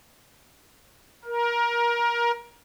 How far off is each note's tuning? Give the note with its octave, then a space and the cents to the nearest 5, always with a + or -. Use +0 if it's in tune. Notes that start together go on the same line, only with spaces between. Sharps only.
A#4 +20